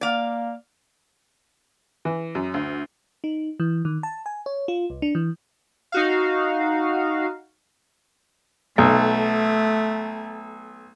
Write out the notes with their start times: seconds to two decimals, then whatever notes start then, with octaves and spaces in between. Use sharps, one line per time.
0.01 A#3 D5 F5
2.05 E3
2.35 F#2
2.54 D2
3.24 D#4
3.60 E3
3.85 D#3
4.03 A5
4.26 G#5
4.46 C#5
4.68 F4
4.90 C2
5.02 D4
5.15 E3
5.92 D#4 F#4 F5
8.78 B1 A3